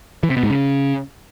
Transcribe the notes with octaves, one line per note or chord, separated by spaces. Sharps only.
E3
C3
B2
G#2
C#3